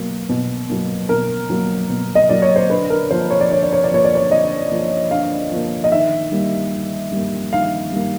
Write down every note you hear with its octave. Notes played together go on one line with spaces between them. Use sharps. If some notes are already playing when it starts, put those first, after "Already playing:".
Already playing: B2 F#3 A#3
B2
F#3 A#3
B2 A#4
F#3 A#3
B2
D#5
F#3 A#3 D5
C#5
C5
D3 B4
A#4
F3 A#3 C5
C#5
D5
D3 C#5
D5
C#5
D5
F3 A#3 C#5
D5
C#5
D3 D#5
F3 A#3
D3 F5
F3 A#3
D#5
D#3 E5
G3 A#3
D#3
G3 A#3
D#3 F5
G3 A#3